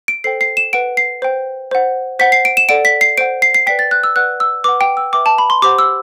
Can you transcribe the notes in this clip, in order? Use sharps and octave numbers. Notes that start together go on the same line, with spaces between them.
D7
A4 C5 G5 C7
C7
E7
B4 F#5 D7
C7
C5 G5
C5 F#5
C5 F#5 B6
C7
D7
E7
A4 D5 F#5 D7
B6
C7
C5 F#5 D7
C7
C7
B4 D5 G5 B6
A6
F#6
E6
B4 D5 F#5 F#6
E6
B4 F#5 D6
G5
E6
B4 E5 G5 D6
A5
B5
C6
G4 C5 F#5 D6
E6